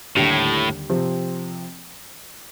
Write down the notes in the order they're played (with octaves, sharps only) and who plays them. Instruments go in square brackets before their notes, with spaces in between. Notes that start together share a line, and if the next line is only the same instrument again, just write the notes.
[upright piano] D#2 D3 G3 [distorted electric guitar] A2
[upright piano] C3 F3 C4